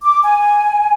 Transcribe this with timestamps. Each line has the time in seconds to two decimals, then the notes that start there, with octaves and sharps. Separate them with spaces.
0.03 D6
0.23 G#5